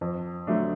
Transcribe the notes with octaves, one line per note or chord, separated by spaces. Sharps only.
F2
D3 F#3 A3 D4